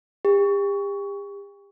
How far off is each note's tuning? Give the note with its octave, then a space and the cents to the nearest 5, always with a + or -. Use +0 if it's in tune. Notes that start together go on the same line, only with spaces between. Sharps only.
G4 +35